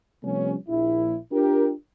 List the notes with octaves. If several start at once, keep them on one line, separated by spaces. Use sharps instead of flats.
C3 F3 G3 A3 B3 C#4
A#1 E4
D4 F4 G4 A#4